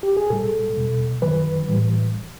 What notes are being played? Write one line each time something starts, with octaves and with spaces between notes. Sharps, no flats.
G4
G#4
A#2 G3 A4
E2 B2 G3
F#2 D#3 F#3 B4
A2 E3 G3